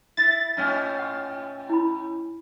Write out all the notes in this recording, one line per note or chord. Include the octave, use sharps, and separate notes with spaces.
E4 A6
A2 C#4 D#4
F#5 C#6
E4 B5